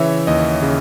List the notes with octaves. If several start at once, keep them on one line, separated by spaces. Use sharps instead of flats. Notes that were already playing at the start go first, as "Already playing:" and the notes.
Already playing: C#3 E3 C#5 E5
D#2 D#5
C#3